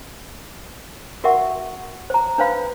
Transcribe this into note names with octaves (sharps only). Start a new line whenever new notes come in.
F#4 A#4 E5 F#5 C#6
C5 A#5
D4 B4 C5 F5 B5